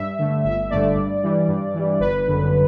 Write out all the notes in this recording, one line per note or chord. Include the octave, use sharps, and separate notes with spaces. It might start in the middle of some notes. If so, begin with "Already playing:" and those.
Already playing: G2 E5
D3 A3
G1 E5
G2 D3 A3 D5
G2
E3 G3
G2
E3 G3
G1 B4
F#2 D3